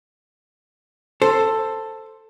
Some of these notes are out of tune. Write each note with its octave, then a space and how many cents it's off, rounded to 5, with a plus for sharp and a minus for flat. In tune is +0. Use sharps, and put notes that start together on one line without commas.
A4 +10 C5 +5